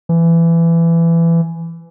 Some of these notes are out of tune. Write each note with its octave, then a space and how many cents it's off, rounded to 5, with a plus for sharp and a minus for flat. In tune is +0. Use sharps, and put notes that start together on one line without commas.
E3 +20